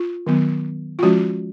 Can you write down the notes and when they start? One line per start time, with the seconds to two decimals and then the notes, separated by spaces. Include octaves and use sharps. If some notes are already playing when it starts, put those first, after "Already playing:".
Already playing: F4
0.27 D#3 F#3 B3
0.99 F4
1.03 F3 G#3 C#4 F#4